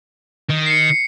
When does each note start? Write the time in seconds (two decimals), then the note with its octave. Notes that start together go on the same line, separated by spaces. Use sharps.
0.49 D#3
0.66 C7 C#7